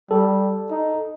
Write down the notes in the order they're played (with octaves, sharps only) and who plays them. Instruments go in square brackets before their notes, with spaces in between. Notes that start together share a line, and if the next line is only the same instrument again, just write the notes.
[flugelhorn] G3 [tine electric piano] A4
[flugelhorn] D#4